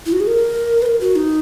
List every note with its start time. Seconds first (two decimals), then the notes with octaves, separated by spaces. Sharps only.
0.06 E4
0.13 F#4
0.20 G#4
0.27 A#4
0.82 B4
0.86 A#4
1.01 F#4
1.16 D#4